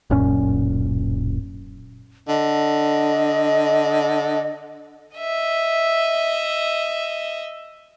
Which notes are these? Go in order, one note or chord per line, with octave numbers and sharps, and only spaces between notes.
D1 F#2 A#2 C#4
D3 D#5
D#5 E5